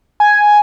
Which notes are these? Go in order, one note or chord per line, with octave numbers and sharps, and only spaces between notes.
G#5